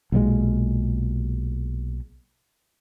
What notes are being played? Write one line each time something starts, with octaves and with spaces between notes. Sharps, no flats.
B1 A#2 D#3 G#3